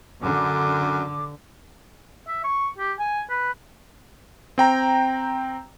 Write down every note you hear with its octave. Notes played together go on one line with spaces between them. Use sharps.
F#2 D3 D6
E5
C#6
G4
G#5
B4
C4 G5 A#5